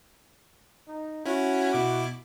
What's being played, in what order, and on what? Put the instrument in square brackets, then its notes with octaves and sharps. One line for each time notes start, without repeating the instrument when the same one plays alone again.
[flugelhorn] D#4
[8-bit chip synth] C#4 E4 [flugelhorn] F#4
[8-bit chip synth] B2 E4 D6